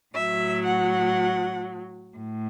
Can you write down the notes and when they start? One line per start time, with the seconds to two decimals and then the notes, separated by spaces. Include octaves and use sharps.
0.15 A2 F#3 E5
0.66 F#5
2.17 A2